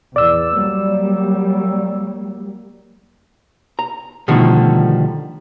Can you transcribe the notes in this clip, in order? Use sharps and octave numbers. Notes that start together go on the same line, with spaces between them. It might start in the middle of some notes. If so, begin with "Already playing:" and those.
E2 D5 E6
F#3 G3 A#3
A#5
B2 D3 D#3 F3 G3 A3